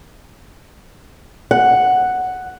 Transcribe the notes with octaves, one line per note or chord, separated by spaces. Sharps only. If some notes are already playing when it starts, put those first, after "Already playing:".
F#5